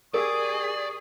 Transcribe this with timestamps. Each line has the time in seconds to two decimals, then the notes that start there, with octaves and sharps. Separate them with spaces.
0.14 G4 G#4 A#4 D5 C#6 D#6